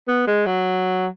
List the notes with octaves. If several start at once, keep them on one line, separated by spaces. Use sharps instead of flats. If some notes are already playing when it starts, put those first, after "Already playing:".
B3
G#3
F#3